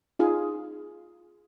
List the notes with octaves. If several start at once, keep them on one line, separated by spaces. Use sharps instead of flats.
D#4 F4 G#4